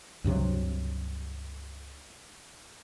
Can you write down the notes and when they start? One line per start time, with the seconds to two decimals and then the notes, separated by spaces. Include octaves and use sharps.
0.24 C#2 G2 C3 F#3